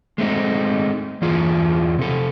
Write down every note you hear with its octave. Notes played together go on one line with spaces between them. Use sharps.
G#3 A3 C4 D#4
E2 E3 F4 G#4
C3 A4